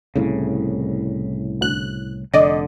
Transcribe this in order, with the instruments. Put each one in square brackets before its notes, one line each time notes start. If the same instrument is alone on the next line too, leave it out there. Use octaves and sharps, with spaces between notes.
[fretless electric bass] C2 A2 C#3
[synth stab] D2 F#6
[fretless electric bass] F1 D3 [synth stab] D5 D#5